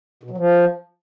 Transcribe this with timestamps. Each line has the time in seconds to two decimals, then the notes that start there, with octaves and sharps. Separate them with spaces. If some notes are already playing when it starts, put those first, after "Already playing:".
0.23 B2
0.30 F#3
0.38 F3